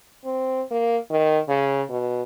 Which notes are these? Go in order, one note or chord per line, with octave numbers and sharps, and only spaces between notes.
C4
A#3
D#3
C#3
B2